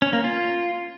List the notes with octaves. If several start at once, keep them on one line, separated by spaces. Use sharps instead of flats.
C#4
A#3
F4